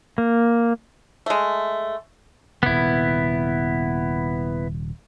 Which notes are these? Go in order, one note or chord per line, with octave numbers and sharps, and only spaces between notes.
A#3
G#3 A3
D#1 C3 B3 E4